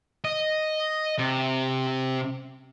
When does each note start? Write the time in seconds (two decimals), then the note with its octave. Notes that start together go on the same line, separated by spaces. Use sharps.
0.24 D#5
1.18 C3